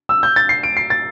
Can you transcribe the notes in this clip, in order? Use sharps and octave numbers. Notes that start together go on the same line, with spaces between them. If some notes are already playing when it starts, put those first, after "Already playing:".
E6
G6
A6
C7
D7
C7
A6